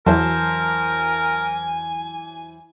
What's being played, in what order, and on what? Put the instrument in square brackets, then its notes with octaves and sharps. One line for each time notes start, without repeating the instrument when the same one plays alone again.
[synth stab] E2 F#3 [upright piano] E3 C5 A5 [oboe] A#4 [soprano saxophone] G#5